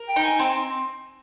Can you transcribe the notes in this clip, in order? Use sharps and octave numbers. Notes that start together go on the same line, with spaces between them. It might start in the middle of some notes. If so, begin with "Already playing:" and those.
Already playing: A#4
G5
D#4
G#5
C4 G5